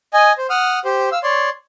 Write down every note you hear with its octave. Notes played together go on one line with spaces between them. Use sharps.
D#5 G#5
C5
F#5 D#6 F6
G4 C5
F5 E6
C#5 D5 C6